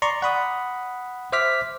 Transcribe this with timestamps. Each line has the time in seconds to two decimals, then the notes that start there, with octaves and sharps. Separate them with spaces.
0.02 D5 A#5 C6 C#6
0.22 F#5 B5 D#6
1.32 C5 E5 D6 F6 B6